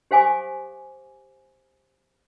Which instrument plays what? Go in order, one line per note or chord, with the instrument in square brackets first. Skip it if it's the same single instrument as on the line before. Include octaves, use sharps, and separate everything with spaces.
[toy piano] G4 C5 F5 G#5 D6 D#6